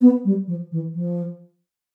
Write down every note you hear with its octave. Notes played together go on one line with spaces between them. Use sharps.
B3
G3
F3
E3
F3